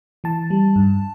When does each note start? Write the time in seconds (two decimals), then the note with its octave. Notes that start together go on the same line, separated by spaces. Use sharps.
0.24 E3 A5
0.50 G3
0.76 G2